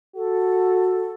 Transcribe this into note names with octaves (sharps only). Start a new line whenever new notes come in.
F#4 A4